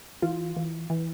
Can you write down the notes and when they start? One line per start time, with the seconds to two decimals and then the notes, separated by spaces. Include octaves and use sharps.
0.22 E3 F4
0.56 E3
0.90 E3